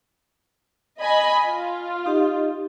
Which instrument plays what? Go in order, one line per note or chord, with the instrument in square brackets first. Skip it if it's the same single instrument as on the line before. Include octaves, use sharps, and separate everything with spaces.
[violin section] D#5 G#5 B5
F4
[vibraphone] D#4 G4 D#5